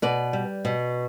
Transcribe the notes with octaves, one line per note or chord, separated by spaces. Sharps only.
B2 B4 D5
G3
B2